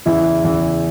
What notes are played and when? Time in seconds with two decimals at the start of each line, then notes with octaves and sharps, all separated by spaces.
0.06 E2 C#3 E3 E4 E5
0.44 E2 C#3 E3